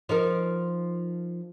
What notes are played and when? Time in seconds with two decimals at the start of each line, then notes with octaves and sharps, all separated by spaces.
0.09 F3 D#4 A#4